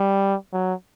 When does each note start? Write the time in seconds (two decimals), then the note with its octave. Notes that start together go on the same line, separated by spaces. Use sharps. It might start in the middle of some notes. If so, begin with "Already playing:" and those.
Already playing: G3
0.53 F#3